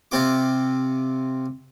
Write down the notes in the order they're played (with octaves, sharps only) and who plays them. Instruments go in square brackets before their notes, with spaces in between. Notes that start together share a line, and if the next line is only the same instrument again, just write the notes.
[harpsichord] C3 C4 F4 D6